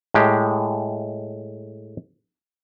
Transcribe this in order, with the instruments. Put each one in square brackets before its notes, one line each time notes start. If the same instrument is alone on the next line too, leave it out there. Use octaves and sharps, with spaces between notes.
[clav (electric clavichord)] A2 G#3 G4